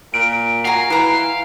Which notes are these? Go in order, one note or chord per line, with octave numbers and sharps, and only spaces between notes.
A#2 D7
F#4 F5 G#5 A#5
E3 A#5 C6